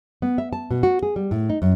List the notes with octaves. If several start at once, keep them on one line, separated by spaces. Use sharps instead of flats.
B3
E5
A5
B2
F#4
G#4
G3
A2
D#4
F#2